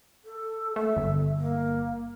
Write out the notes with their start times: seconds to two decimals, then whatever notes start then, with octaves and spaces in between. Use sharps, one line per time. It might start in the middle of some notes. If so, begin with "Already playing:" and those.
0.25 A4
0.76 A3 E5
0.97 G1
1.37 A#3